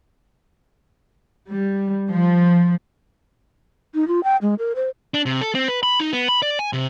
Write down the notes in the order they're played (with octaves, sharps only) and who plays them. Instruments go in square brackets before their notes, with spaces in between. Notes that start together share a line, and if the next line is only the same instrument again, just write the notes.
[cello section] G3
F3
[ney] D#4
F4
G5
G#3
A#4
C5
[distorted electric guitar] D4
C3
A4
C4
B4
B5
D#4
B3
B5
D5
G#5
C3